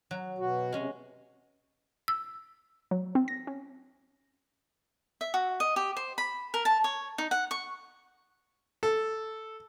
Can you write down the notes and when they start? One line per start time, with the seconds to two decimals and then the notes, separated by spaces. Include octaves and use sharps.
0.11 F#3
0.38 B2 F#4
0.72 C3 G#3 C#4
2.08 E6
2.91 F#3
3.15 C4
3.28 A#6
3.47 C#4
5.21 E5
5.34 F#4
5.60 D#5
5.76 G4
5.97 C5
6.18 B5
6.54 A#4
6.65 A5
6.84 C#5
7.18 D#4
7.31 F#5
7.51 C#6
8.83 A4